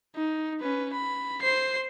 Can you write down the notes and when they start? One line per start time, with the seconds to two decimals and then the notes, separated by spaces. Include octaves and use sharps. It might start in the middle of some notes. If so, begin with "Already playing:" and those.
0.16 D#4
0.61 C#4 B4
0.93 B5
1.42 C5 C7